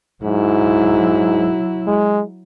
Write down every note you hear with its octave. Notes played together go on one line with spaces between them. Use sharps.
G#2 F#3 E4
G#3